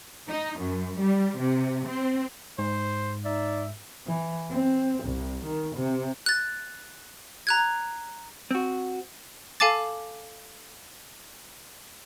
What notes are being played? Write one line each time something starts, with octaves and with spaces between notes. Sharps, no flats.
D#4
F#2
G3
C3
C4
G#2 C5
D#4 D5 E5
E3
C4
C2
D#3
C3
F#6 A6
A#5 F#6 G#6
C4 F#4
A4 F5 G#5 A5 D6 A6